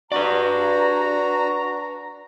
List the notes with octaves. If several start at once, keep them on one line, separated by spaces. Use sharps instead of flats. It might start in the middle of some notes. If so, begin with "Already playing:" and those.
D4 F#4 B4 D5 A#5